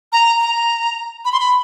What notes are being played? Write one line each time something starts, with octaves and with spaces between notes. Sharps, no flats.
A#5
A#5
B5
C6
B5